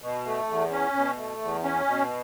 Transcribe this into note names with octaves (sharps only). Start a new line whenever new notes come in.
B2
A3
E2
C#4
B2
A3
E2
C#4
B2